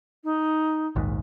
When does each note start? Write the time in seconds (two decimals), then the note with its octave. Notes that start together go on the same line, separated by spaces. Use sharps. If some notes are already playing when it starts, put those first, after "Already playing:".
0.24 D#4
0.96 A#1 D#2 G#2